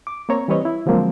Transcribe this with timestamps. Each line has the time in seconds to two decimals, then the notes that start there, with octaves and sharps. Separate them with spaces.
0.07 D6
0.29 A#3 C4 C#5 A#5
0.48 E3 G3 C4 B4 C#5 D#5
0.65 E4
0.86 D3 F3 F#3 G#3 A#3 C4